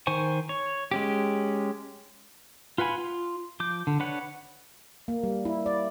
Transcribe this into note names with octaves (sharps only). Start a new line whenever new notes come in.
D#3 C5 G#5 C#6
C#5
G#3 C#4 G4
F4 B4 F#5 G#5 B5
F4
F3 D6 G6
D3
D4 B4 C#5 F#5
A#3
G3
E4
D5